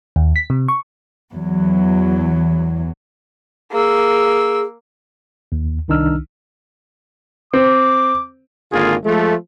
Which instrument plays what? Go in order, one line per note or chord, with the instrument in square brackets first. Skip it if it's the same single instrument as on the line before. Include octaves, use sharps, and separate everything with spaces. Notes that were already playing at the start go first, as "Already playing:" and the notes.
[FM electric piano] D#2
B6
C3
C#6
[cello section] E2 F#3
[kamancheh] A#3 E6 [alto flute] G#4
[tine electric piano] D#2
C2 D#3 D4 D#4 E6 F6
[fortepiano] C4 [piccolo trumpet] D6
[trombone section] G#1 D3 A#3 F4 G#4
F3 G#3 A3